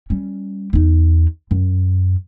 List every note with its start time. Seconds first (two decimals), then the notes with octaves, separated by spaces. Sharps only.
0.10 G3 C#4
0.73 E2 D#4
1.51 F#2